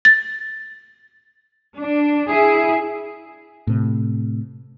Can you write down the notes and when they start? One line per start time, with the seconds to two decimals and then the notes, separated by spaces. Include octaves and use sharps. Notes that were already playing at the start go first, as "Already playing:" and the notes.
0.05 A6
1.78 D4
2.28 E4 G#4
3.67 A2 C3